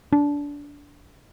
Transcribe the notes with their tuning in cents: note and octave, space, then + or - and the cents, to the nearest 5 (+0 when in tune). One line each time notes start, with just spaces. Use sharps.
D4 -20